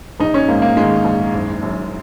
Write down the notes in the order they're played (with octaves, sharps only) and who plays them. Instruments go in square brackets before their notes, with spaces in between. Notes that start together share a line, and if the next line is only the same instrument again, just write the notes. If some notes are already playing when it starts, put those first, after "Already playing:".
[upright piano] A#1 D#4
C#4
G#2 A#3
A#3
D#3 G#3
A#1
F#1
F#2